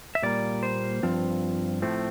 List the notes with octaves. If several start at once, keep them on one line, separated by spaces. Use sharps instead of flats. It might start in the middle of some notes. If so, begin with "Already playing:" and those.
E5
A#2 G3 A#3 D5
C5
G2 F3 C4 F4
A2 F3 A3 C4